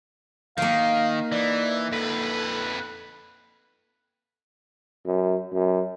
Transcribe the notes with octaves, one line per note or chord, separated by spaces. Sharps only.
D#3 A#3 D#4 F5
E3 D5
F2 A4 B4
F#2
F#2